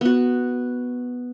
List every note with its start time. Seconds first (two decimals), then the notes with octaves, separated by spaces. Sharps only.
0.01 B3 F#4